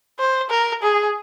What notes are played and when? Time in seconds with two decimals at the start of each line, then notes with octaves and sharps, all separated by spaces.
0.18 C5
0.50 A#4
0.82 G#4